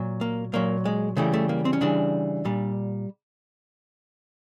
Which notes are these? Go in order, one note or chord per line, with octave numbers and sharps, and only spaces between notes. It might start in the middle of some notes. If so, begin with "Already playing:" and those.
Already playing: A#2 F#3
A#3
A#2 F#3 A#3
G#3
C#3 E3 G3 A3
A3
A#3
C4
C#4
C#3 E3 G3 D4
A#2 G3